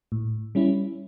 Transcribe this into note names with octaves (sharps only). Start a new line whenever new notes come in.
A2
G3 C#4 E4